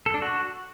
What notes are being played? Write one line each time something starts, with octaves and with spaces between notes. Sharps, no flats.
A4
D4
F#4